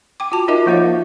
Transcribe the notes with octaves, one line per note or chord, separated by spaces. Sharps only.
G5 D6
F4 F#4 A5
D#4 F4 A#4 D#5 E5
F3 A#3 F4 C#5 F5